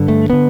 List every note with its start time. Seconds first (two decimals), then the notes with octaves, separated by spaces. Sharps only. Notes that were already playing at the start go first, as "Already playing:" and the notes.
Already playing: G2 D3
0.08 A3
0.30 D3 B3